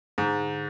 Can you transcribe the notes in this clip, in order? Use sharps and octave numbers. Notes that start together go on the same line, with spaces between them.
G#2 D3